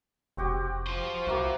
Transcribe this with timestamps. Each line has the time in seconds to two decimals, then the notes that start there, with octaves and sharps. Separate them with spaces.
0.37 F1 C4 F#4 G4
0.87 F4 C5
1.27 C2 A#3 E4 F#4